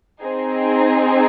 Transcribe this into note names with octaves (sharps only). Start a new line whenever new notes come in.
C4 D#4 G#4